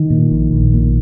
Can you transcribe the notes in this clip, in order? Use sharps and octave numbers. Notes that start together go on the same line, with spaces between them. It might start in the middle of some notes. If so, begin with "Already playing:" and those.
Already playing: D#3
A#2
A#1
A#1
A#2